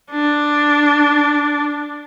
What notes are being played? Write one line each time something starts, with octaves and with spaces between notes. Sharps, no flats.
D4